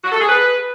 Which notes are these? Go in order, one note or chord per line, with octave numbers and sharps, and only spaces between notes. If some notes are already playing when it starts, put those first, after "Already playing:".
F#4
A4
G#4
B4